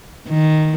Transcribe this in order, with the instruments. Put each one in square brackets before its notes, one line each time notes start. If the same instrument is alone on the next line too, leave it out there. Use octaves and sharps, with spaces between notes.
[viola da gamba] D#3